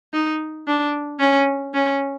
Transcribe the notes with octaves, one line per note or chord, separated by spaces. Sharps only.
D#4
D4
C#4
C#4